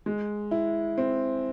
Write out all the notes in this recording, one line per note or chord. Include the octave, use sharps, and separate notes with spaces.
G#3
E4
C4